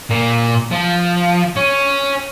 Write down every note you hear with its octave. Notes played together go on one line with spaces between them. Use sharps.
A#2
F3
C#4